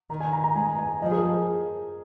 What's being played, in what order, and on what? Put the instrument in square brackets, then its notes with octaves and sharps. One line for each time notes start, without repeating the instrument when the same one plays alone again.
[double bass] D#3 [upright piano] A#5
[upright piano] G#5
A#5
A#5
[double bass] G#3 [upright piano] G#5
[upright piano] G#5
[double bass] F3 [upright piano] D#5
[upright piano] G#4
A#4